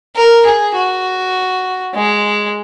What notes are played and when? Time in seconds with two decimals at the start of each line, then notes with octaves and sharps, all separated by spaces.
0.16 A#4
0.46 G#4
0.75 F#4
1.94 G#3